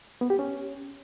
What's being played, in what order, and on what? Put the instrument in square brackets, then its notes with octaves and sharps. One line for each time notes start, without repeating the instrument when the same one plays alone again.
[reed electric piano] B3
G4
C#4